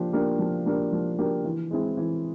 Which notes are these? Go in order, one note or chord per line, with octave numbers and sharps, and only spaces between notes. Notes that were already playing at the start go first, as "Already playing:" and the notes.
Already playing: F3 A#3 D4 G4
A#3 D4 G4 A#4
F3
A#3 D4 G4 A#4
F3
A#3 D4 G4 A#4
E3
G#3 C4 E4 G#4
E3